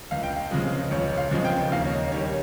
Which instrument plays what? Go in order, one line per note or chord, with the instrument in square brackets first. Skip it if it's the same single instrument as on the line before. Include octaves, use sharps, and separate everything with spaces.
[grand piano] C#2 F5
G5
F5
C#3 F3 G#3 D#5
C#2 C#5
F5
C#3 F3 G#3
G5
D#2 F5
C#5
D#5
D#3 G3 C#5